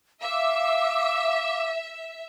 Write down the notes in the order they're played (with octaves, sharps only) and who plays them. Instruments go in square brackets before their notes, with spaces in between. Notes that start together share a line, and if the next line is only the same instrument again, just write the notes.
[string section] E5 [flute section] F5 D6 E6